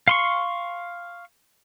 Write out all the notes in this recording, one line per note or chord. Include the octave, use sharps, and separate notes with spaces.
F5 C6 C#6